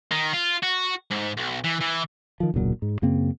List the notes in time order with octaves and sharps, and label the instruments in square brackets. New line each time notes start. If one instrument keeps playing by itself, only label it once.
[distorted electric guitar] D#3
F4
F#4
G#2
B1
E3
E3
[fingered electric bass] D#3 F3
E1 C#2 A#2 F#3
G#2
F#2 C#3 A#3 C4